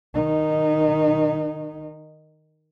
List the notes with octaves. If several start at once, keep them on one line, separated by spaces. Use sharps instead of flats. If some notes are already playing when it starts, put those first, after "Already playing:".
D#3 D#4